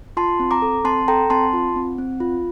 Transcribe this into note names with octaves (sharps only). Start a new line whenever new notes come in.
F4 A5 C6
C4
A#5 D6
A4
C4 A5 C6
A4 G5 A#5
C4 A5 C6
F4
C4
C4
F4